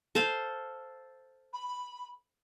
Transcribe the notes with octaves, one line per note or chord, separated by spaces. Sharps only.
A4 C5 F5
B5